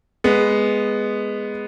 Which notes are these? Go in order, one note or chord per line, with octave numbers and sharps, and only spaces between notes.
G#3 B3